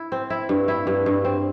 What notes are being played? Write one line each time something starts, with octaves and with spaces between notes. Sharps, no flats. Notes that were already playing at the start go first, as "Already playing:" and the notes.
Already playing: E4
C4
E4
G2
E4
G2
G2
C4